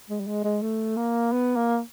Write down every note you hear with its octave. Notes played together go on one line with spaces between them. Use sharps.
G#3
G3
G#3
G#3
A3
A#3
B3
A#3